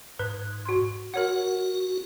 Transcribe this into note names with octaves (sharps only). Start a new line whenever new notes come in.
G#2 B4
F#4 C6
F#4 A#4 C#5 F#5